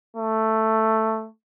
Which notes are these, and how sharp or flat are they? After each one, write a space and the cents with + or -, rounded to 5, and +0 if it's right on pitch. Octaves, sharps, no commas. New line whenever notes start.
A3 +5